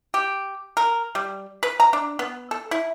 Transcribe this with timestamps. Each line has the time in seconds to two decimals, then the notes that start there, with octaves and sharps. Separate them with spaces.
0.14 G4
0.77 A#4
1.15 G3
1.63 B4
1.80 A#5
1.93 D4
2.19 B3
2.51 A4
2.71 E4